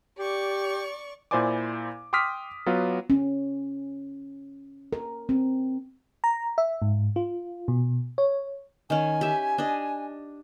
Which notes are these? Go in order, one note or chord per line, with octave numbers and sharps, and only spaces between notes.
G4 D5 C#6
A#2 E4 C5 D5 G#5 D6
G5 C6 D6 D#6 F6 B6
F#3 B3 F4
C#4
A#4
C4
A#5
E5
G#2
F4
B2
C#5
D#3 C#4 G#5
G4 E5
D4 D#5